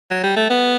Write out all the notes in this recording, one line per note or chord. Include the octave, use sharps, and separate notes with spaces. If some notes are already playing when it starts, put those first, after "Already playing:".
F#3
G3
A3
B3